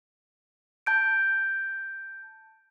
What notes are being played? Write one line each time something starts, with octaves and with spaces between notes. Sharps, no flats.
A5 G6 D7